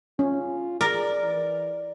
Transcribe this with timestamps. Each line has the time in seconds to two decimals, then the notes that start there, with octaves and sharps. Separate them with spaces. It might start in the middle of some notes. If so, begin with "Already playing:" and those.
0.19 C#4 F4
0.81 G#4 A#4 D5
1.23 E3